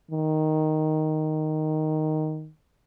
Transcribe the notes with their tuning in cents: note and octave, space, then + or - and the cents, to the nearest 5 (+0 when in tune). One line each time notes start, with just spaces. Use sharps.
D#3 +0